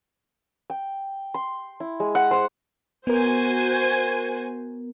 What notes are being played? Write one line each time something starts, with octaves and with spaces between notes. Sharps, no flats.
G5
C6
E4
G#3
F#5
C5
B3 F#4 A#4 C5 G#5